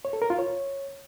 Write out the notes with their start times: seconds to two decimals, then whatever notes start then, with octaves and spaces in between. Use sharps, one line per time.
0.05 C#5
0.13 A4
0.22 A#4
0.30 F4
0.39 C#5